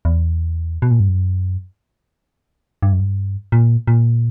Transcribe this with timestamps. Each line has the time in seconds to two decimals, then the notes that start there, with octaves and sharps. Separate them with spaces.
0.05 E2
0.82 B2
0.91 A#2
1.00 G2
1.08 F#2
2.82 G2
2.92 F#2
3.00 G2
3.52 A#2
3.87 A#2